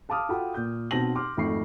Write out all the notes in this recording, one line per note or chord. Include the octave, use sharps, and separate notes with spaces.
F5 A5 B5 D6 D#6 F6
F4 F#4 A4 F#5 G5 B5
A#2 G6
B1 B2 C4 A5 A#6 F#7
C6 D6 F6
G#1 F2 A3 B5 C#6 C7